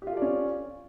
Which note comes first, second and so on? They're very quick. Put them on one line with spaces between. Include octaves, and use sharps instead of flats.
G4 F4 A4 D5 C#4